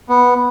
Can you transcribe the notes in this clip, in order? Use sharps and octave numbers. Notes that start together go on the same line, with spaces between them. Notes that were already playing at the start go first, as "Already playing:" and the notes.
B3